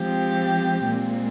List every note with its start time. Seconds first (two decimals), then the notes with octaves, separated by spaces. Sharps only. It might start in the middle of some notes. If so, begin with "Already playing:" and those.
Already playing: F3 G#3 C4 G4
0.85 A#2 G#3 C4